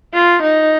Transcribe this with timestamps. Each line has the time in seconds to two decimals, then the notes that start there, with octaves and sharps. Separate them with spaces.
0.14 F4
0.42 D#4